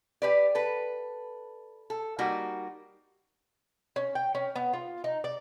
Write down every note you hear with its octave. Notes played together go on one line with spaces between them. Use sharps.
G4 B4 D5
A4 B4
A4
G3 A#3 D#4 F#4
C#4
G5
C#4
B3
F4
D#4
D5